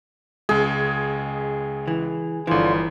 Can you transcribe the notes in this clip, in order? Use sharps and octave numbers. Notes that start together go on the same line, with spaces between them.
C#2 G#3 G#4
E3
G1 D3 E3 F3 F4